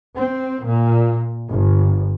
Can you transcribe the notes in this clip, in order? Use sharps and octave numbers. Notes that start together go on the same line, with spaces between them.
C4
A#2
G1